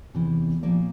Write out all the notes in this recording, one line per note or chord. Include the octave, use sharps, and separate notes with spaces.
E2 C3 E3
A#2 F3 A#3 D5